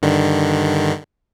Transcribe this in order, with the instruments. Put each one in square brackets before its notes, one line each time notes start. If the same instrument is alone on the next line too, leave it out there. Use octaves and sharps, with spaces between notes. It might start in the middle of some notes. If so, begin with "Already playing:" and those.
[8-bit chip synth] G2 D3 D#3